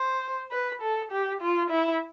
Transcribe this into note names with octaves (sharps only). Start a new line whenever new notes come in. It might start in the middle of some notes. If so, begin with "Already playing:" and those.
Already playing: C5
B4
A4
G4
F4
E4